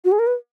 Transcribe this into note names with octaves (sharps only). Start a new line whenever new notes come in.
F#4
G#4
A#4
B4